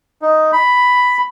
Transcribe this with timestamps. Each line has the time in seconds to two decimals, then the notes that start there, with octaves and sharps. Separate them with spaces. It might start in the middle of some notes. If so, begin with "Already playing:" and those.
0.22 D#4
0.53 B5